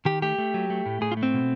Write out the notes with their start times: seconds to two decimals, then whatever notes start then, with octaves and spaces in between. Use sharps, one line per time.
0.05 D#3 G4
0.22 A3 G4
0.38 A3
0.54 F#3
0.70 A3
0.86 A2
1.01 A2 G#4
1.12 F4
1.17 A3
1.23 C4
1.34 B2